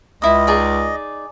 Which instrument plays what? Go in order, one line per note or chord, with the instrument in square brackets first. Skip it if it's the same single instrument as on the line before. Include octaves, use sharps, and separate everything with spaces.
[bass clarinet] C#2 [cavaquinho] E4 D#6 [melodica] D#5
[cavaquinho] D#4 G#4 D5